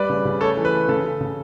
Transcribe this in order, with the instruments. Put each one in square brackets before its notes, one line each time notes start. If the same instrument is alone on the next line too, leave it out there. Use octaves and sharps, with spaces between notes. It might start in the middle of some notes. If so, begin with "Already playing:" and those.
Already playing: [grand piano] G3 B4 D5
C#3
C#3
A3 A4 C#5
E3
B4
A3
C#3 A4
C#3
C#3